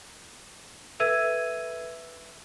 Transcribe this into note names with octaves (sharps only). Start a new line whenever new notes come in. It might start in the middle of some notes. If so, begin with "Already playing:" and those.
A4 B4 E5 E6 G#6 D#7